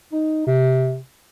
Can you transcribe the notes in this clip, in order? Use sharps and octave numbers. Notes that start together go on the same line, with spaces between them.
D#4
C3